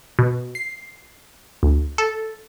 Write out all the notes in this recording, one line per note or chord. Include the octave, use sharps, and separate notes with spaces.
B2
C7
D2
A4